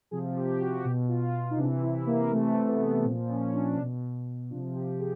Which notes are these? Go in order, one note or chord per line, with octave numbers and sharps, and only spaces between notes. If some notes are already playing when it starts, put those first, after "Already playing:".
C3 F3 G#4
G4
F#4
B2 G4
F4
D#4
C3 E3 D4
E4
A#3
C3 E3 A3
B3
A#2 F3 C4
C#4
D4
B2
C3 F3 D4
G4
G#4